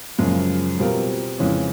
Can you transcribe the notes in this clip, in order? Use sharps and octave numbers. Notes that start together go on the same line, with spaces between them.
F#2 C#3 F3 G#3
B2 G3 C4 F4 A#4
F2 C#3 E3 G#3 C#4